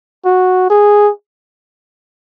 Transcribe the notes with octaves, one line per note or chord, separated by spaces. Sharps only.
F#4
G#4